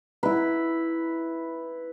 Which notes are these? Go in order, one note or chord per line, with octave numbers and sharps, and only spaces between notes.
E4 B4